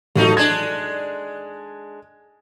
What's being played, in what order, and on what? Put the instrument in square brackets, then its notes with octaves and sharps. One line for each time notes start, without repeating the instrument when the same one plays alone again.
[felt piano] A1 F#3 [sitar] D#2 A3 D#4
[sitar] G#3 D4 [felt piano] G#6